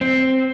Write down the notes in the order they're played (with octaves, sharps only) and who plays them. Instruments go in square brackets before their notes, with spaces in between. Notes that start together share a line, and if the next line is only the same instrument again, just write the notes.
[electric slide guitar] C4